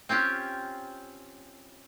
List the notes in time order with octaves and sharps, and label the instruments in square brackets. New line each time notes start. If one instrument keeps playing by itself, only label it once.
[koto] C4 C#4 F4 G4